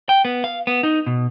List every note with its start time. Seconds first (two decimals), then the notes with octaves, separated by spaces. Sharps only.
0.09 G5
0.25 B3
0.44 F5
0.67 B3
0.83 D#4
1.07 B2